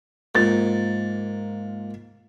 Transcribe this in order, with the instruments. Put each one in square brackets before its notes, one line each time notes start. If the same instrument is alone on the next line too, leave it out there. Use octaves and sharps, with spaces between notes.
[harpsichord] G#2 [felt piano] A#3 F4 A6